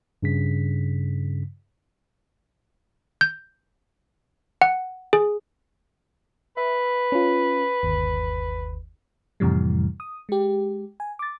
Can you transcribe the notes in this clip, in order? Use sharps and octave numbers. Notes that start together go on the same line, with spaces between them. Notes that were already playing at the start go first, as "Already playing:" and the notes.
G2 C#3 B6
G6
F#5
G#4
B4 E5
C#4 F4
G1 D#2
F2 A2 C3 E3 G3
D#6
G#3 G4
G#5
D6 A6